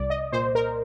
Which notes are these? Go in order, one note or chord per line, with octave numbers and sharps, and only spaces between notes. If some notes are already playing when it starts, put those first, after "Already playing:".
Already playing: C2 D5
D#5
A#2 C5
A#4